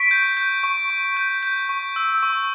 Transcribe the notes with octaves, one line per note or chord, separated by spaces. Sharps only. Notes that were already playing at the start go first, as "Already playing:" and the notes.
Already playing: C#6 B6 D7
G6
G6
C#6
C#6
G6
G6
C#6
E6
C#6